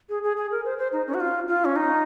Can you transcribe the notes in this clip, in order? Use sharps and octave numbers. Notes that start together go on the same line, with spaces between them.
G#4
G#4
G#4
A#4
C5
C5
D#4
C#4
F#4
F4
F4
C#4
D#4